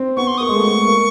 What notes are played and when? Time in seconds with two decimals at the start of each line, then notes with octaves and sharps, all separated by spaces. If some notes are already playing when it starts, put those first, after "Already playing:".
Already playing: C4
0.17 B3 C#6
0.27 C6
0.37 D#6
0.40 A#3 C#6
0.49 G#3
0.56 A3
0.72 A#3
0.88 A#3